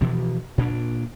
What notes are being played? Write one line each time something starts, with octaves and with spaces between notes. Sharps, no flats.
B2 E3 F3
A#2 C4 D4